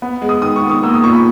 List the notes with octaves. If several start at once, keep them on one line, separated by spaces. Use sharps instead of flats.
B3
G#3
D#6
D#3 D#6
C#6
B3
D#6
A#3 E6
D#6
A#2 C#6
B5